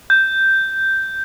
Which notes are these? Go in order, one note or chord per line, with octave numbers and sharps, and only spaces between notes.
G6